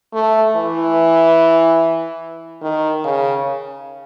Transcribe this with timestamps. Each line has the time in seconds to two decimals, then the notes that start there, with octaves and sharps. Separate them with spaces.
0.13 A3
0.56 E3
2.62 D#3
3.04 C#3